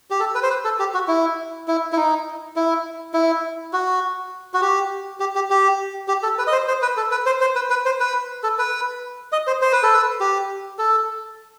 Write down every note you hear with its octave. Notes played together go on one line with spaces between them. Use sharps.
G4
A4
B4
C5
B4
A4
G4
F#4
E4
E4
E4
D#4
E4
E4
F#4
F#4
G4
G4
G4
G4
G4
A4
B4
D#5
C5
C5
B4
A4
B4
C5
C5
B4
B4
C5
B4
A4
B4
D#5
C5
C5
B4
A4
B4
G4
A4